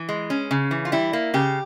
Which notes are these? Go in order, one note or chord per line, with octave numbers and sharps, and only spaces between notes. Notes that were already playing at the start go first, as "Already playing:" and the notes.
Already playing: E3
G#3
C#4
C#3
E3
F4
G3 E4
A#3
C#3 G4